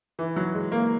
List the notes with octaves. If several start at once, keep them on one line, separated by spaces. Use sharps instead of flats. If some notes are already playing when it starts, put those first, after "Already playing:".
E3
F#3
G#3
A#3